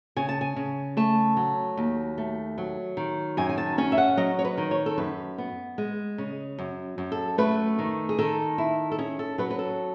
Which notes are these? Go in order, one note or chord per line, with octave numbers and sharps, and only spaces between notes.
C#3 G#5
A5
G#5
C#3
A3 A5
F#3
D#2
A3
F#3
D#3
F#2 G#5
G#5
A5
C#4 G#5
E5
F#5
F#3 D#5
C#5
B4
D#3
C#5
A4
F#2 B4
B3
G#3
C#3
F#2
F#2
A4
A3 B4
D#3
G#4
D#3 A4
E4
A4
C#4 G#4
A4
F#3 B4
B4
A4